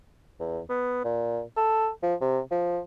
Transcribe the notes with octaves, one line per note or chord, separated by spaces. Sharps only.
E2
B3
A#2
A4
F3
C3
F3